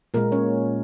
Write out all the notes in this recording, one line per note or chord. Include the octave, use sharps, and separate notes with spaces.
A#2 G#3 A#3 A#4
C#4 C#5